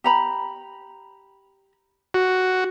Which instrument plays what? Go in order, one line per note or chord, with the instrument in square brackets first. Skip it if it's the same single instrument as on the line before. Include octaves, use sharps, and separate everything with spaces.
[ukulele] G4 A#5 B5
[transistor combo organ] F#4